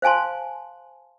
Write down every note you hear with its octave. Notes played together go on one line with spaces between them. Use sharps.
C5 F5 G#5 A5 C6